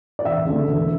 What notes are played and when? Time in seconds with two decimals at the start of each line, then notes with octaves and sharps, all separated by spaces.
0.19 D5
0.24 E1 E5
0.45 D2 C#3
0.66 E1